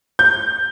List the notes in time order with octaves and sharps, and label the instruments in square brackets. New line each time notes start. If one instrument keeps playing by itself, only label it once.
[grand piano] G6